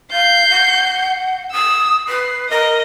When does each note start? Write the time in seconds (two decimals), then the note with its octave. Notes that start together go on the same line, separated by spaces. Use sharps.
0.12 F5 G6 C7
0.49 F#5
1.52 D#6 E6
2.08 B4 C7
2.50 A#4 D#5